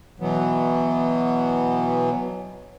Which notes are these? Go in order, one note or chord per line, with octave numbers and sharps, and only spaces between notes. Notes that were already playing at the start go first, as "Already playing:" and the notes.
B2 E3 F#3 B3